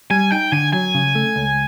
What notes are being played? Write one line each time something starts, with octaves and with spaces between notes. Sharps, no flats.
G3 G#5
D#4 G5
D3 G#5
F#3 G#5
C#3
A3
C#2